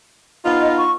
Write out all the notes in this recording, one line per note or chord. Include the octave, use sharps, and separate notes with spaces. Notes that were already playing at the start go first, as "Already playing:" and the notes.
B3 D#4 F4
D#5
C#6